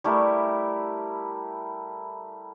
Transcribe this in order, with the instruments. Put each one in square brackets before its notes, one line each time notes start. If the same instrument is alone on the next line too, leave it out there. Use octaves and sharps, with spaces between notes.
[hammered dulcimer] G3 A3 E4 A#4